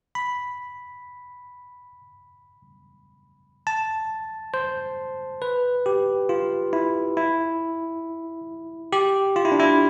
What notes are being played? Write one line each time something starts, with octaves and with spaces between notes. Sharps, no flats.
B5
A5
C5
B4
G4
F4
E4
E4
G4
F4
E4
D4
E4